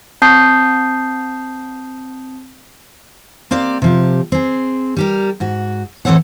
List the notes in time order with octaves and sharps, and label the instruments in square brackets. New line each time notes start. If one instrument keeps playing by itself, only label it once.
[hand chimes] C4 A5 D#6 G6 C7
[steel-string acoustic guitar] A#3 C4 G4 D5
C3 F3 G4
C4 G#4
G3 G4 A#4
G#2 F#4
A2 E3 C4 A4 C#5 F#5